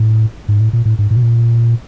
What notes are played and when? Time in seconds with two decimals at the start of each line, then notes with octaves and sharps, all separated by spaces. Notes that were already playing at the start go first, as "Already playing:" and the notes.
Already playing: A2
0.49 G#2
0.60 A2
0.73 A#2
0.85 A2
0.99 G#2
1.11 A2
1.17 B2
1.22 A#2